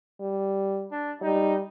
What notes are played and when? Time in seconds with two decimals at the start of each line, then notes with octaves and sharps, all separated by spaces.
0.21 G3
0.92 D4
1.22 G3 D#4